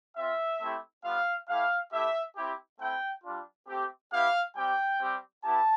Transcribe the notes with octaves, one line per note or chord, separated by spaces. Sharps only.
C4 F4 E5
A3 C4 E4 G4
G3 B3 F4 F5
A3 E4 G4 F5
A3 E4 G4 E5
C4 E4 G4
A3 C4 E4 G5
G3 D4 F4
A3 C4 G4
B3 E4 G4 F5
G3 C4 G4 G5
G3 C4 G4
B3 E4 G4 A5